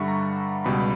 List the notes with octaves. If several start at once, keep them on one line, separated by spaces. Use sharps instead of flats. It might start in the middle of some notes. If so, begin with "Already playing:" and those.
Already playing: G2 D3 G3 E5 F#5 B5 C#6
A#5
C#2 B2 G3 B5
B5